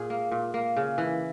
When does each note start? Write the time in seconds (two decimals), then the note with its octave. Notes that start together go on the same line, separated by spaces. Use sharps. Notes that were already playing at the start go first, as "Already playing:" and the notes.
Already playing: A#2 G#4
0.10 A#3
0.32 A#2
0.54 A#3
0.77 C#3
0.98 E3